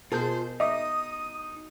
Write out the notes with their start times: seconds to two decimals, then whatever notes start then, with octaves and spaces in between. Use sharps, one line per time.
0.12 B2 F4 G#4 A#4 C5 A5 G6
0.60 D#4 D#5 E5 D6 D#6